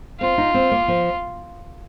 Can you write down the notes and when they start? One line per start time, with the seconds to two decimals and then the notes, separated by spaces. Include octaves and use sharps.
0.21 C4 F4
0.38 D#4
0.54 C4
0.71 A#3
0.88 F3